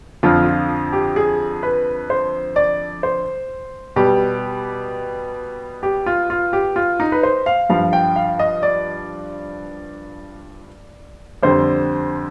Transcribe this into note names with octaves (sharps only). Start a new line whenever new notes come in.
F2 D3 F3 F4
F4
G4
G#4
B4
C5
D5
C5
B2 G3 G4
G4
F4
F4
G4
F4
D#4
B4
C5
F5
G2 F3 F5
G5
F5
D#5
D5
F2 D3 G3 C5